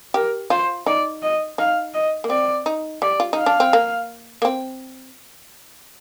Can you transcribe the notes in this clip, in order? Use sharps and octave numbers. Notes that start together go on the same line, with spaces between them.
G4 A#4
F4 C5
D#4 D5
D#5
D#4 F5
D#5
A#3
C4 D5
D#4
G3 D5
F4
D#4 F5
D4
C4
A#3
A#3
C4